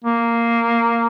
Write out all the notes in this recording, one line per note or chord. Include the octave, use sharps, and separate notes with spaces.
A#3